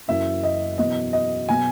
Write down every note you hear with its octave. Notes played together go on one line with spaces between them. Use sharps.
F#1 F#2 E3 E5
D#5
E2 B2 F#3 D#5
D#5
B2 F#3 G#5